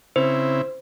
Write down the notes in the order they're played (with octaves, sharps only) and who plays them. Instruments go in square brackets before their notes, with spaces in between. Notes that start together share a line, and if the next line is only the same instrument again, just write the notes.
[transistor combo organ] C#3 C4 E4 [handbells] C5